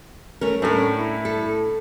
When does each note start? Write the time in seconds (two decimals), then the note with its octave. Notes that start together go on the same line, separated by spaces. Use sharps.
0.41 A3 C#4 A#4
0.62 A2 A3 C#4 D4 A#4
0.96 E4
1.25 A4